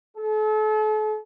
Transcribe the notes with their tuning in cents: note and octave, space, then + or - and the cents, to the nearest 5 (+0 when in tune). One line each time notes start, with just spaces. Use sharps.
A4 -40